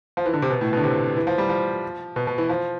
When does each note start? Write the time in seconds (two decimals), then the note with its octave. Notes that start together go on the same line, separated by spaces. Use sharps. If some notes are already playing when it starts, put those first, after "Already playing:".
0.17 F3
0.26 E3
0.33 D3
0.42 C3
0.50 B2
0.61 A2
0.73 B2 D3
0.84 C3
1.17 E3
1.27 F3
1.38 G3
1.49 F3
2.16 B2
2.27 B2
2.38 E3
2.49 F3